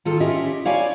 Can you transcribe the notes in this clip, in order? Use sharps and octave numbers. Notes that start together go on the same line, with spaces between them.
D#3 F4 A4
C#4 E4 F4 G4 D#5
E4 C#5 D5 F5 G5 G#5